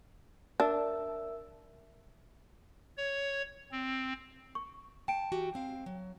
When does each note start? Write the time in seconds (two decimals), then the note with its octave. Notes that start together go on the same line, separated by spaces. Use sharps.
0.60 D4 A#4 E5 E6
2.98 C#5
3.72 C4
4.55 C#6
5.08 G5 A5 D7
5.32 E3 F#4 G4
5.54 G#3 C4 F5
5.86 F#3